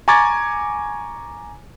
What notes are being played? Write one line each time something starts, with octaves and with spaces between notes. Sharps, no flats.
G#5 A#5 C#6 D6 G#6 A6